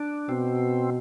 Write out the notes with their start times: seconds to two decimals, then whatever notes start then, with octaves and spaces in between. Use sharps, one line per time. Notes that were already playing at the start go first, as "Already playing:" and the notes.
Already playing: D4
0.29 B2 C4